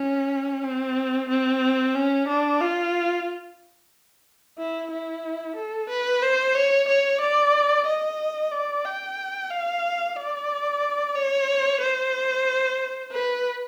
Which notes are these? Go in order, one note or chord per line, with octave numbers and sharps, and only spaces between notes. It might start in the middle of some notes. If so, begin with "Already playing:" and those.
Already playing: C#4
C4
C4
C#4
D4
F4
E4
E4
A4
B4
C5
C#5
C#5
D5
D#5
D5
G5
F5
D5
C#5
C5
B4